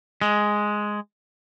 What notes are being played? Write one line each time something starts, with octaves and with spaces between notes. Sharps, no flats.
G#3